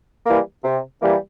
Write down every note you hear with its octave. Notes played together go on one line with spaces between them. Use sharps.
E3 G3 A#3
C3
E3 G3 A#3